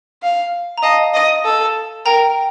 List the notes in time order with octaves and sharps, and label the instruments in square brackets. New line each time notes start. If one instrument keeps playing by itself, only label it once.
[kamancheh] F5
[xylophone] A#5
[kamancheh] D#5 [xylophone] F5 A5
[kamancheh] D#5
A4
[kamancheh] A#4 [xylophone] G5 A#5